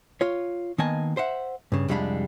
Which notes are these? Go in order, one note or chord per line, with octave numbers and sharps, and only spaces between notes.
F4 C#5
D#3 A#3 B3 D#5 G#5 A5
C5 E5 F#5
G2 C#3
C2 F2 G3 G#3 D4 B5